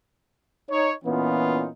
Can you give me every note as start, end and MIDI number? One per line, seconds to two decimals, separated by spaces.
0.70 0.91 63
0.70 0.91 73
1.05 1.68 46
1.05 1.68 52
1.05 1.68 59
1.05 1.68 61
1.05 1.68 63
1.05 1.68 65